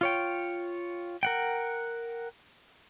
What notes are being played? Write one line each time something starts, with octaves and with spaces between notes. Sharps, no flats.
F4 C#5 G5
A#4 F#5 G5